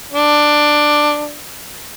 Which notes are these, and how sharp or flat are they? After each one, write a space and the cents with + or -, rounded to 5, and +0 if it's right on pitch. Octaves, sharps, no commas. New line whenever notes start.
D4 +10